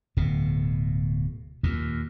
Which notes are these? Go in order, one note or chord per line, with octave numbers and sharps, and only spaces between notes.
D1 B2
D#2 A#2